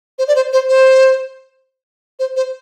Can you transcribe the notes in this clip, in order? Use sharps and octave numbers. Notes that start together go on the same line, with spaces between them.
C5
D5
C5
C5
C5
C5
C5